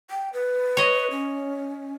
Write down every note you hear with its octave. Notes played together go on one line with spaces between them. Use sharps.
G5
B4
C#5 D#5
C#4